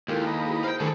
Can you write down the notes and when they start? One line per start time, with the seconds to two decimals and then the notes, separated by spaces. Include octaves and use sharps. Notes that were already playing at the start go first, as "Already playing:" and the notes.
0.08 D#2 G#3 E4 F4 G4 A4 A#4
0.27 B4 D#5 F5 A#5
0.47 E4 F#4 G#4
0.64 C5 F5 G5
0.80 D3 D#3 G3 A3 G#4 A4